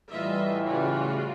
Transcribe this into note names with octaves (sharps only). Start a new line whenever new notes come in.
A2 E3 G3 F4 D#5 E5
C#3 G3 F4 F#4